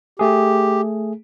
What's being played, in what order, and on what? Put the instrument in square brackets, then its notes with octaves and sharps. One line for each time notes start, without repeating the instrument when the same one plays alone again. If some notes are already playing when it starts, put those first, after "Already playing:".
[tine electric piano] A3 G#4 [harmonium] G4